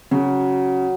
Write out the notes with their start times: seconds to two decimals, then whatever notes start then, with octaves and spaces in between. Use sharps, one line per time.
0.11 C#3 F#3